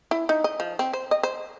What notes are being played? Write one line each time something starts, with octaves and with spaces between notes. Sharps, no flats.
E4
D#4
D#5
F3
C4
C5
D#5
C5